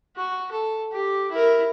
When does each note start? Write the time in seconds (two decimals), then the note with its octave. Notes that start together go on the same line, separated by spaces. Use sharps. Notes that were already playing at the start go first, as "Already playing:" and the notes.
0.16 F#4
0.51 A4
0.92 G4
1.31 E4 A#4